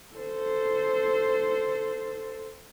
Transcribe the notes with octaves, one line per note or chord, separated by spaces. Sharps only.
A4 C5